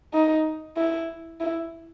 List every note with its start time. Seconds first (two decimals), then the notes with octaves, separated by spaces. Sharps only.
0.14 D#4
0.77 E4
1.41 E4